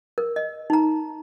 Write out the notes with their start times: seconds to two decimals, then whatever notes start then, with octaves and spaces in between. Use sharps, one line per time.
0.18 A#4
0.36 D#5
0.70 D#4 A#5